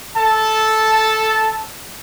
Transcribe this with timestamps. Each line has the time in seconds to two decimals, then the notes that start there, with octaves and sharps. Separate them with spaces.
0.17 A4 A5